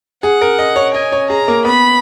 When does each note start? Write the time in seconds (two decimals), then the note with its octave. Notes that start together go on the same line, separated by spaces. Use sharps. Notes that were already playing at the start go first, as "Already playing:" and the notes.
0.23 G#4 F#5
0.41 A#4
0.59 D#5
0.76 C#5
0.94 D#5 G#5
1.12 C#5
1.30 G#4 A#5
1.48 A#3
1.65 B3 B5